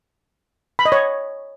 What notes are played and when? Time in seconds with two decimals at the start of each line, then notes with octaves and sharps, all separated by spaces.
0.79 B5
0.85 D#5
0.92 C#5